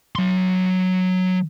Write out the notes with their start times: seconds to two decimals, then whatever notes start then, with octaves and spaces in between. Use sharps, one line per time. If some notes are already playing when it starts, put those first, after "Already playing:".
0.16 F#3 C6